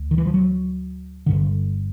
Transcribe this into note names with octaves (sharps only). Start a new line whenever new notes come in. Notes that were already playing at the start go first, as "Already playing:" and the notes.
Already playing: D2
D#3
E3
F3
F#3
G1 G2 D3